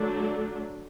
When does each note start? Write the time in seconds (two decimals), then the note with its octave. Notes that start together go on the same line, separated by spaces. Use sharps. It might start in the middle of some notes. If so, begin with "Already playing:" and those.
Already playing: D3 F#3 A3 D4